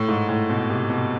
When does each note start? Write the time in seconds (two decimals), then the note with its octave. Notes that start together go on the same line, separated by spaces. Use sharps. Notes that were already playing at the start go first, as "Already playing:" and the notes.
Already playing: A2
0.09 G#2
0.29 A2
0.50 B2
0.69 C3
0.90 B2